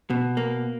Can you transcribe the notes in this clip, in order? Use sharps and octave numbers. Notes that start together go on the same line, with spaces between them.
B2
A#3